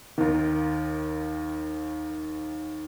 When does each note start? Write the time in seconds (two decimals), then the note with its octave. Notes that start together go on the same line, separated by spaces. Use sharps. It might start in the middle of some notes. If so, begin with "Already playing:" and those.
0.18 D#2 D#3